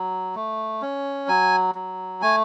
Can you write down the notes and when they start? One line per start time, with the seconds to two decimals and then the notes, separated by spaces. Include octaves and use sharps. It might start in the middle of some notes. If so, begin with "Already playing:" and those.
Already playing: F#3
0.35 A3
0.82 C#4
1.28 F#3 G#5
1.75 F#3
2.22 A3 G#5